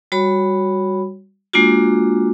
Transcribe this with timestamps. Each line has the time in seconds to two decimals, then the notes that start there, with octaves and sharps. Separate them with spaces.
0.12 G3 F#4 C#5 B5
1.53 G#3 A#3 D4 F4 F#4